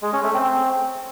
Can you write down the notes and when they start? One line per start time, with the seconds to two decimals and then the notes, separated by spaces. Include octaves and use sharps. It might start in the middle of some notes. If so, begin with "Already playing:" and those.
0.02 G#3
0.13 C#4
0.24 A3
0.34 C4